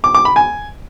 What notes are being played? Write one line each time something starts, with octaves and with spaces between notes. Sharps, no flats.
D6
D6
B5
G#5